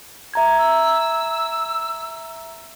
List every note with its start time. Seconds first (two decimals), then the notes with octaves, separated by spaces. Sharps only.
0.34 E5 A#5 G#6
0.58 E6